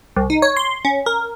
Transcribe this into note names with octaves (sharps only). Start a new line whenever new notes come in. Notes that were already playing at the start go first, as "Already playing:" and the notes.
C2
D#4
C#5
C6
C#4
A#4